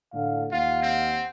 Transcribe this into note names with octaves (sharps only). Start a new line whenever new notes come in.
A2 D3 F5
D#2 F4 F5 F#5
C4